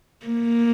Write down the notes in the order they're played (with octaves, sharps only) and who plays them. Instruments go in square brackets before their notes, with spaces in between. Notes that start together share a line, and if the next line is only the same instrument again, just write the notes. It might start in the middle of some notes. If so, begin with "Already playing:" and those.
[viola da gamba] A#3